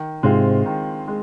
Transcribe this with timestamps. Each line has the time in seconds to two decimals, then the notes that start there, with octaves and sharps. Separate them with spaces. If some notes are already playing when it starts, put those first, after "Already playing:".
Already playing: D#3
0.23 G#2 C3 G#3 C4 F4
0.66 D#3
1.08 G#3